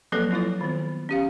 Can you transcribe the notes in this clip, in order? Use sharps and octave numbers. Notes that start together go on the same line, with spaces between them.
F3 F#3 A#3 C4 A4 B4
C4 E4 F4 C#5
D#3 B3
C#4 G4 F5